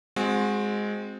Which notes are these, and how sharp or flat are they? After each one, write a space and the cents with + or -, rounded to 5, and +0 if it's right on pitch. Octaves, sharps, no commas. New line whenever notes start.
G#3 +0 C4 +0 F#4 -30